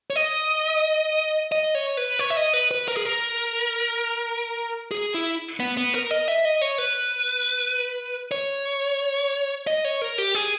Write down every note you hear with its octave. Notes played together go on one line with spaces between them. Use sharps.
C#5
D#5
D#5
C#5
B4
C#5
E5
D#5
B4
B4
A#4
G#4
A#4
G#4
E4
B3
B3
A#4
D#5
E5
D#5
C#5
B4
C#5
D#5
C#5
A#4
G4
G#4